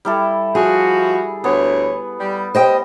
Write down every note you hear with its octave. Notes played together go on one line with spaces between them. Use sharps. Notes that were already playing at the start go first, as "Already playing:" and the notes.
G3 E4 A4
F3 F#4 G#4
D2 B3 C#5
G3
G3 C5 D#5 G5